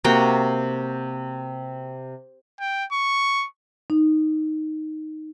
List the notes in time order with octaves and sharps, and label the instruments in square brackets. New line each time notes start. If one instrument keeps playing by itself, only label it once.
[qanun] C3 A#3 F#4 G5
[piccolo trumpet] G5
C#6
[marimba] D#4